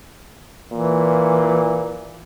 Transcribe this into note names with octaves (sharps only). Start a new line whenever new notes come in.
A#2 E3